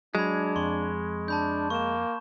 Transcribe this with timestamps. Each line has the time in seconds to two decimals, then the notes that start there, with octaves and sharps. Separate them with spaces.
0.15 F#3 G#3 D4 B5 G#6
0.56 F2 C6 C#6
1.28 D4 A5 B5 G6
1.70 A#3 C#6 E7